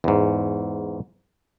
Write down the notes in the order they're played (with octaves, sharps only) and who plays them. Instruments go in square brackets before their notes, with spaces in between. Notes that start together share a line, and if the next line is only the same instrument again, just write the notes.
[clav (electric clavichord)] E2 G#2